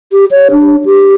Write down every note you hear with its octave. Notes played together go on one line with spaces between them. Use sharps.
G4
C#5
D4
G4